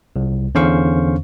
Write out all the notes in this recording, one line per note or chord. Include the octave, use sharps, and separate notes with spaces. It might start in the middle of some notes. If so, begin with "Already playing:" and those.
C2
E2 D3 C#4 C5 F5 C#6